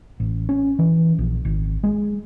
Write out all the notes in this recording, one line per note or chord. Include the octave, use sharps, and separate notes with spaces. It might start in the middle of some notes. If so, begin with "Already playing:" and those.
A1
C#4
E3
A#1
G#1
G#3